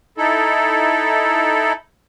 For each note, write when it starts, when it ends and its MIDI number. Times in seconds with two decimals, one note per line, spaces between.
0.18 1.73 63
0.18 1.73 64
0.18 1.73 69